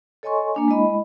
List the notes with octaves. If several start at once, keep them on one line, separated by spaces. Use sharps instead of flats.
A4 C#5 D#5 G#5 C6 C#6
A#3 D4 G#5
G#3 E4 D#5 B5